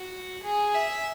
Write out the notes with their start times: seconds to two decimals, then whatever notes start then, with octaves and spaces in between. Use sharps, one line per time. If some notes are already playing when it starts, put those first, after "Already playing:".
Already playing: F#4
0.42 G#4
0.75 E5